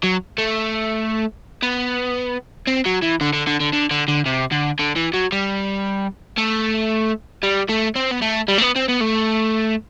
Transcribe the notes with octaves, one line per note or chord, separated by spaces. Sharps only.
F#3
A3
B3
C4
F#3
E3
D3
D3
D3
D3
D3
D3
D3
C3
D3
D3
E3
F#3
G3
A3
G3
A3
C4
B3
A3
G3
A3
B3
C4
B3
A3